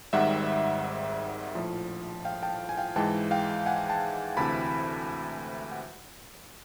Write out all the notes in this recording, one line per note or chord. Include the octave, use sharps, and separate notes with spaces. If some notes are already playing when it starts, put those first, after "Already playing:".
G#1 G#2 D#3 G3 E5 F#5
A#1 A2 F3
F5 G5
G5 A5
G#5
F5 G5
G#2 E3 G#3 G5 A5
F5 G5
F#5 G#5
G5 A5
D2 C3 E3 A5 B5
F#5